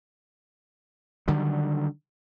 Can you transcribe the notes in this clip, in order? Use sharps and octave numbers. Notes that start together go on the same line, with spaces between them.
D3 D#3 F#3 G3